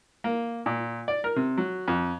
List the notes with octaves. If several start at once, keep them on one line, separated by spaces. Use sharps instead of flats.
A#3
A#2
D5
A#4
C3
F#3
F2